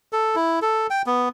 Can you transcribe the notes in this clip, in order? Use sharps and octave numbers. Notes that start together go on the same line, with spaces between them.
A4
E4
A4
G5
B3